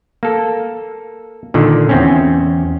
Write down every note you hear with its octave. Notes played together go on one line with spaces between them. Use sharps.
A#3 A4
A#2 D3 D#3
E2 C4 C#4